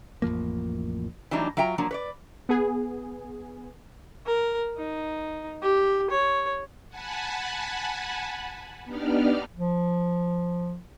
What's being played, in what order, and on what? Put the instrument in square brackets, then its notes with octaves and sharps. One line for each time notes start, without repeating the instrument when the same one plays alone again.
[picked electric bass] A1 F2 F3 A#3
[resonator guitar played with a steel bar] E3 F#3 G3 A3 D4 D#4
F#3 F4 E5 G5 A#5
F3 F#3 A#3 D4
B4 C#5 D5
[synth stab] B3 G#4
[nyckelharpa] A#4
D#4
G4
C#5
[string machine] F#5 G#5 A5 B5
B3 D4 D#4 G4 D5 F6
[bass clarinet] F3